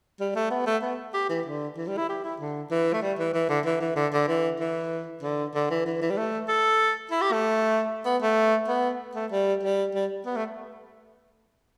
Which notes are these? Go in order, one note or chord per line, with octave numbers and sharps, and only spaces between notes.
G3
A3
B3
A3
B3
G4
E3
D3
E3
G3
E4
G4
E4
D3
E3
A3
G3
E3
E3
D3
E3
E3
D3
D3
E3
E3
D3
D3
E3
E3
E3
G3
A3
A4
E4
G4
A3
B3
A3
B3
A3
G3
G3
G3
B3
A3